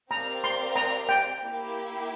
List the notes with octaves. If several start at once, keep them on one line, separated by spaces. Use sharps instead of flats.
C4 G4 A#4 D5 F5 A#5
C6
A#5
G5
A#3 E4 G4